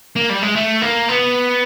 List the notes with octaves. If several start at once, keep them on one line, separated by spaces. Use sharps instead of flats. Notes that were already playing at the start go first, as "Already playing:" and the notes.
A#3
G3
G#3
A3
A#3
B3